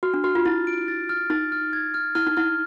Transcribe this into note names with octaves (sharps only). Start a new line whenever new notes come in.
F#4 F6
D4
F#4 F6
F4
E4 A6
D7
A6
F6
D#4 A6
F6
G#6
F6
E4 F6
D#4
E4 F6